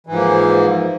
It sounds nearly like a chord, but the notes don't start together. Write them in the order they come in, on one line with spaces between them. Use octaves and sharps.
E3 G#2 F3 A#3